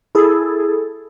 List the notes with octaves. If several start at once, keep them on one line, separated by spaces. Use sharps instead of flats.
E4 G#4 A4